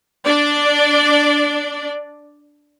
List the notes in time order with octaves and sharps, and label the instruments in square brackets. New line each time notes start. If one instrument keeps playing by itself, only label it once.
[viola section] D4 D5